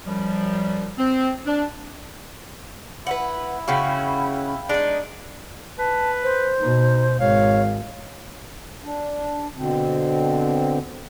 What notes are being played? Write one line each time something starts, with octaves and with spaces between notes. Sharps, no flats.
F#2 F3 G3
C4
D4
E4 B4 C5 F#5
C#3 C#4 F#4 F5 G5 B5
G#3 D4 D#4
B4 A5
C5
B2 D#4
G#1 C#5 F5
D4
B2 D3 C4